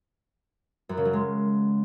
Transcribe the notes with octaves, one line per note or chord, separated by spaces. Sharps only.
F#2
C#3
F#3
G#3